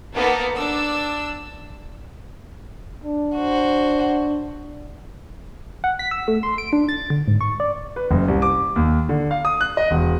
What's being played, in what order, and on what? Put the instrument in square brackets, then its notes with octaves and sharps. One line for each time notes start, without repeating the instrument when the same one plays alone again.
[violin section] A#3 B3 D#4 A4 A#4
D4 E6
[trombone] D4
[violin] F#4 C5
[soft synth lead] F#5
B6
E6
A3
C6
D7
D4
A6
D3
G#2
C#6
D5
[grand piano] B4
F#1
C2
D6
D#2
D3
F5
D#6
F#6
D#5
E1